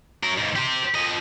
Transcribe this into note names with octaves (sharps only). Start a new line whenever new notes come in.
F#3 A#4
D#2 G#2
G4 C5
F3 D#5